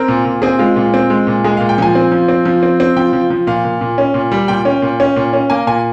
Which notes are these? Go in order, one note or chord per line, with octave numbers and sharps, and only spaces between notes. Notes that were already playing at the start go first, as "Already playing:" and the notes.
Already playing: C4 A#4
A#2
A#2
C4 G#4
G#3 F4
A#2 F4
C4
G#3
A#2
G#3 G#4
A#2 F5
G5
F3 G#5
C4
F3
C4
F3
C4
C4
F3 G5
F3
F3
A#2 F5
A#2
A#2
C#4
A#2
G3
A#2 G5
C#4
A#2
C#4
A#2
C#4
A#3 G#5
A#2 G#5